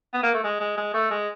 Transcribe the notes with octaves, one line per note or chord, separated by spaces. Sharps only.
B3
A#3
A3
G#3
G#3
G#3
A3
G#3